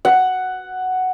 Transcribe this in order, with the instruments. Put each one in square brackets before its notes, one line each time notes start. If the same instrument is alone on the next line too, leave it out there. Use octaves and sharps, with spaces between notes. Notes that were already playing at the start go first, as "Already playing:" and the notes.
[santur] F#5